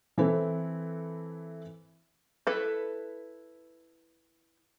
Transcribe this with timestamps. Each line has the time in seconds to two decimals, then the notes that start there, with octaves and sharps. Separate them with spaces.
0.18 E3 C4 E4 A4 B4
2.47 E4 A4 B4